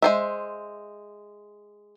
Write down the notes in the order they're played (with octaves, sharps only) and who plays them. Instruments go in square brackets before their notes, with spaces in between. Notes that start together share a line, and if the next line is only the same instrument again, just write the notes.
[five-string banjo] G#3 C5 E5